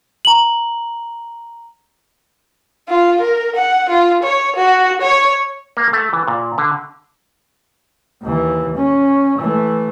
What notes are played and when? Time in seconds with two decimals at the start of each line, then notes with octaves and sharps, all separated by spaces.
0.25 A#5 F#7
2.89 F4
3.20 A#4
3.56 F#5
3.89 F4
4.23 C#5
4.56 F#4
5.01 C#5
5.77 A#3
5.93 A3
6.13 E3
6.28 A#2
6.58 D3
8.22 D#2 E3
8.75 C#4
9.38 E3 A3